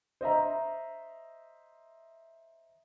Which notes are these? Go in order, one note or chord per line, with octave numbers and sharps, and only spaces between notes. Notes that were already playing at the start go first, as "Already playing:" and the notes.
C5 D#5 E5 A#5